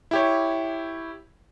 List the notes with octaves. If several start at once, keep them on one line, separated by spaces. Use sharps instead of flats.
E4 G4 C#5